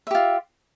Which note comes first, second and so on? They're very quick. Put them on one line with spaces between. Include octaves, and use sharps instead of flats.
E5 G4 F4